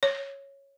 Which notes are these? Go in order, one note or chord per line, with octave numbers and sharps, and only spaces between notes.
C#5